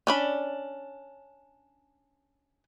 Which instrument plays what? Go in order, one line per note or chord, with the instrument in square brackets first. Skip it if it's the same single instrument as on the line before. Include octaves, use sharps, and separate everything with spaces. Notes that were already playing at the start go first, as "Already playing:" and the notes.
[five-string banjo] C#4 D4 B5